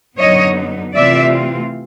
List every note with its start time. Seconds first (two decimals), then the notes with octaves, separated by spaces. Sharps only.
0.17 F#2 D3 F#3 B3 D#4 C#5 D#5
0.95 C3 E3 A3 C4 F4 D5 E5